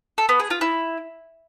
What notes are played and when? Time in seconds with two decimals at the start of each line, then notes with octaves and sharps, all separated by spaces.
0.18 A4
0.29 B3
0.40 G#4
0.50 F4
0.61 E4